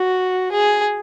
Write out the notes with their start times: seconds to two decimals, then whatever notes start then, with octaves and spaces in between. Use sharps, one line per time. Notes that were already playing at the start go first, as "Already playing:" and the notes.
Already playing: F#4
0.52 G#4